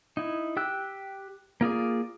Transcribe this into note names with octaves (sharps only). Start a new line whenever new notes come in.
D#4 E4
G4 G5 E6 F#6
A#3 F4 G#4 D5